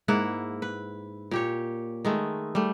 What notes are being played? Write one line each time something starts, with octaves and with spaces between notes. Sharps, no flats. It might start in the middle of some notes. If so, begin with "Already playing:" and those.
G#2 A#3 E4 F#5
B4
A#2 G4 C#5
D#3 G#3 A3
G3 A3